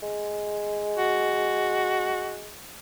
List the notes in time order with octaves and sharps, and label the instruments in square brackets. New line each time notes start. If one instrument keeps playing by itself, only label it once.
[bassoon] G#3
[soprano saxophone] F#4